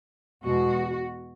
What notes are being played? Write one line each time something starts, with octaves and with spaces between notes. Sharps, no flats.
E2 B2 G#3 F#4